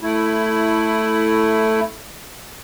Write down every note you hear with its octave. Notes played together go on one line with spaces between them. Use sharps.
A3 E4